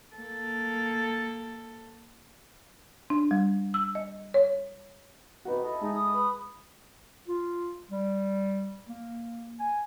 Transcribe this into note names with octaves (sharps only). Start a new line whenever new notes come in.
A#3 A4
D4
G3
E6
D#5
C#5
C3 B3 D#4 F#4 B4
E4 A4 D#5
G#3 D#4
D#6
B4 B5
F4
G3
A#3
G#5